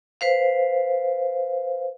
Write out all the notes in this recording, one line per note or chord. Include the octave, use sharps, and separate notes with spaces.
B4 C5 F5